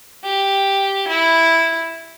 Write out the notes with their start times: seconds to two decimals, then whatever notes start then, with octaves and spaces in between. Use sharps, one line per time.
0.24 G4
1.08 E4